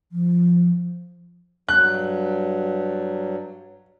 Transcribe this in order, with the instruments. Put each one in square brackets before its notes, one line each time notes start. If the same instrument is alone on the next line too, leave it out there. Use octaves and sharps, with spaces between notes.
[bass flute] F3
[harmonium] G2 F#3 [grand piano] F#6